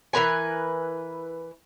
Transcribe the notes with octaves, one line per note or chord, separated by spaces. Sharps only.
E3 A#4 B4 G#5